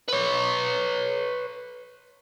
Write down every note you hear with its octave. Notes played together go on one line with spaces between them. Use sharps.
B4 C#5